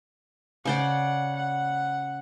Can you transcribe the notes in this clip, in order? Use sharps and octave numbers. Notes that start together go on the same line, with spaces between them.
C#3 C5 D5 F#5
F#5